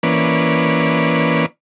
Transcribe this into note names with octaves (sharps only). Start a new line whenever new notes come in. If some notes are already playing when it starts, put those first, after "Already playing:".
E3 A#3 C#4 B4 D5